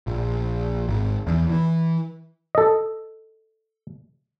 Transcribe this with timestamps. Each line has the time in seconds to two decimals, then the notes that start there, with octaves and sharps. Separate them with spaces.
0.07 A#1
0.88 G#1
1.27 E2
1.50 E3
2.55 A4 D#5